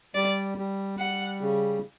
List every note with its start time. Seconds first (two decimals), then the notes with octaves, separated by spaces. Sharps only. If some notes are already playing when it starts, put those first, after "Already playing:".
0.15 G3 D5
0.58 G3
0.99 G3 F#5
1.41 C#3